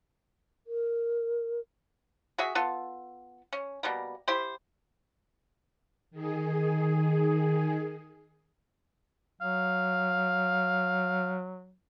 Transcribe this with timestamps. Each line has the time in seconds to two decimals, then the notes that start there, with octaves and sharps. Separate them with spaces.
0.67 A#4
2.38 F#4 G#4 E5
2.55 B3 F4 A4
3.53 C#4
3.83 B2 G3 A#3
4.28 E4 G4 C5
6.11 D#3 G#4
9.41 F#3 F5